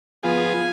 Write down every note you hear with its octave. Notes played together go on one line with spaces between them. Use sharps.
F3 B3 F4 G#4 G#5